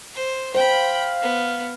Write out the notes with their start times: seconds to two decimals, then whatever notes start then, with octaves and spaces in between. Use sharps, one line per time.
0.14 C5
0.55 C5 F5 G5 B5
1.22 B3